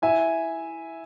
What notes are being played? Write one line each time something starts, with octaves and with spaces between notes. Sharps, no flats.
E4 E5 G#5